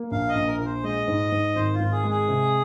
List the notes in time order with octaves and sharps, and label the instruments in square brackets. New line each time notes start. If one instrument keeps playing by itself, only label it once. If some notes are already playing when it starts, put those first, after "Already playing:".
Already playing: [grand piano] A#3
[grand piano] A#1 [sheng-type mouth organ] F5
[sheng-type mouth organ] D#5
[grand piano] A#1
[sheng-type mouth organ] A#4
[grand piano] A#2 [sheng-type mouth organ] A#4
[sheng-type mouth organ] C5
[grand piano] G#3 [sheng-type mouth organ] D#5
[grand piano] G#2
G#2
[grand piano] G#1 [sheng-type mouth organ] C5
[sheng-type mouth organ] F4
[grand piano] G#1
[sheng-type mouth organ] G#4
[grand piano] G#3
[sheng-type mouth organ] G#4
[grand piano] C3